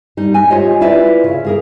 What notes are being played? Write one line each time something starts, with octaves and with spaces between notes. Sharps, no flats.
G3 D#4
G#5
F4 G4 C5 C#5 D#5
E4 F4 B4 D5 E5
C#3
A#3 G#4 A#4